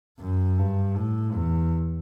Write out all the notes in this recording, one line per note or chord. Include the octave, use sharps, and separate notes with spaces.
F#2
G2
A2
E2